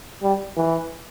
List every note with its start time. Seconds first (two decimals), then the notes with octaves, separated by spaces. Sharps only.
0.23 G3
0.57 E3